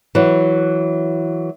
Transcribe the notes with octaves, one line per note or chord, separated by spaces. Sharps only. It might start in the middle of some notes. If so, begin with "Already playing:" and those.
E3 F#3